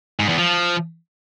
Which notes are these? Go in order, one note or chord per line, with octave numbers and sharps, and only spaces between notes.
G#2
E2
F3